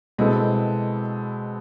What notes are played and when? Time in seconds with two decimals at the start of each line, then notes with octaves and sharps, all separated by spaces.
0.18 B2 G#3 C4 E4 A4